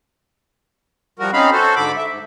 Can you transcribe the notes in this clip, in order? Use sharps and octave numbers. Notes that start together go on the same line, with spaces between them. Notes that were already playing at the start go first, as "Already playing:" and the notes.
F3 G3 F#4 A#4
C4 C#4 D#4 F5 B5
F#4 A4 C5
G#2 D3 B5 D6
E5
G#2